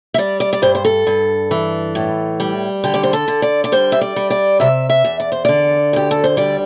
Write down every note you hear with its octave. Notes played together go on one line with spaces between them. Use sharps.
E5
G3 D5
D5
D5
G2 C5
C5
A4
G2
E3
A2
G3
D3 G4
D5
C5
A4
D3
D5
D5
G3 C5
E5
D5
G3
D5
C3 E5
E5
E2
D5
C5
D3 D5
D2 G4
A4
C5
G3 D5